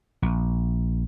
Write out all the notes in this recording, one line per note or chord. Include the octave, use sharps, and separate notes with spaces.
A#1